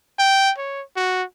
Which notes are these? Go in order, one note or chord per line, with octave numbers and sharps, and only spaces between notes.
G5
C#5
F#4